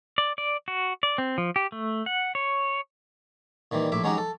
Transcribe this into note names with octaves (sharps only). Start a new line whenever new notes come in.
D5
D5
F#4
D5
C4
F3
G4
A3
F#5
C#5
A#2 D#3 E3 G3
A#1 A2 E5 D6
F#3 G#3 C#4 D#4 F#4 G4
A4